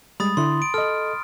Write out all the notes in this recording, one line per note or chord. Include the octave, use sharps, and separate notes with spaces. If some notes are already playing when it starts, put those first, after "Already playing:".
G3 G#3 B5 D#6 A6
D3 E4 C6
D7
A4 D#5 F6